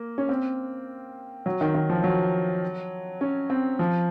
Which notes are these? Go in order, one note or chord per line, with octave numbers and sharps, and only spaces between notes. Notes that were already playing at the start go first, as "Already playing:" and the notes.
Already playing: A#3
C#4
C4
F#3
D#3
D#3
F3
F#3
C#4
C4
F3